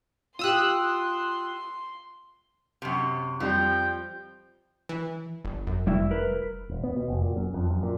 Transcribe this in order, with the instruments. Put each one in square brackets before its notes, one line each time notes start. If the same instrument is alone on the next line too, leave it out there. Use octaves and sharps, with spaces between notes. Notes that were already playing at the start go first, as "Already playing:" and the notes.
[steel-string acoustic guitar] F4 G4 [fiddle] C6 [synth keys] D#6 E6 F#6
[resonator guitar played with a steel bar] F#2 C3
[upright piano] F2 G3 [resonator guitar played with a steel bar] F3 [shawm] G5
[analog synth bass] E3
G1
F#2
[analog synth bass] F1 [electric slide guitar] G3 E4 E5
[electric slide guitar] A#4 B4
[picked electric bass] D#1
B3
B2
F1
A#2
F#2
F2
F#2
A#2